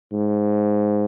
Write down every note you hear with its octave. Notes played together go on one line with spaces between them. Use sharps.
G#2